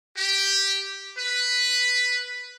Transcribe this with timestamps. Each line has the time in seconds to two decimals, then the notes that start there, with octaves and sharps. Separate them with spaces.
0.17 G4
1.18 B4